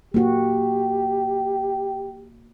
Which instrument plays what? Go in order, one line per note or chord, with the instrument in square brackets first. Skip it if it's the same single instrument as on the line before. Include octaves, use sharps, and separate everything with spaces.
[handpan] A#3 F#4 [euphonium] G4